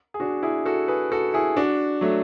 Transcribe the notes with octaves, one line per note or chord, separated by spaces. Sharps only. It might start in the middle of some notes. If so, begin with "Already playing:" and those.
G#4
D4 F#4
E4 G#4
F#4 A4
G#4 B4
F#4 A4
E4 G#4
D4 F#4
F#3 A3